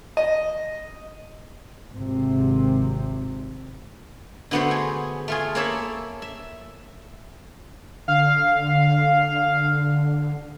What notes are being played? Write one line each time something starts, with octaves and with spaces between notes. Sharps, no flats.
D#5
G#1 C3
D3 A3 B3 F#4 B4 C5
G#4
A3 F4 G#4
A#3 A4 C#5 E5 B5
E5
D3 F5